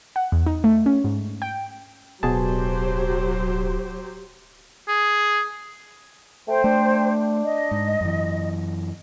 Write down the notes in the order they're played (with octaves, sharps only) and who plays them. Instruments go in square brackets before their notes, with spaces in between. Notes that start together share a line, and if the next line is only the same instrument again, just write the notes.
[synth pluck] F#5
E2
D#4
A3
C#4
G#2
G5
[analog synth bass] D1 [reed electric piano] B2 G#4 A5 [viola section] F#3 G4 C5
[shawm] G#4
[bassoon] A3 [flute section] C5 G5
[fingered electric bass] A3 [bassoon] D4
[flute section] D#5
[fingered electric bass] G#2
F#2 E3